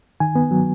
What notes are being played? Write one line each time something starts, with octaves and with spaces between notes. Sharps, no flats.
D#3 G#5
B3
F#3